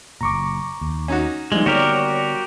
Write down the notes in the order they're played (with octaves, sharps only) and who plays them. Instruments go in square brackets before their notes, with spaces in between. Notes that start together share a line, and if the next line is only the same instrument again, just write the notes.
[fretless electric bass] F#1 A#2 [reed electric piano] A#5 C#6 D6
[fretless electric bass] D#2
[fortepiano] C#4 D#4 F#4
[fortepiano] A#2 D#3 [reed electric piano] F3 G3 [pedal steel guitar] G#3 [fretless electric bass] A#3
[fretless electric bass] D3 G3 B3 [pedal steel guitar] F#4 G4 A#4 [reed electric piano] C#5 D5